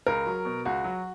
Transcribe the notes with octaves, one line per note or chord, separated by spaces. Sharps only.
C#2 A#4
F#3
B2
C#2 F#4
F#3